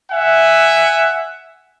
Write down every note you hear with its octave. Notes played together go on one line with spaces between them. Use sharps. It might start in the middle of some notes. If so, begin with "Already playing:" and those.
E5 F#5 G#5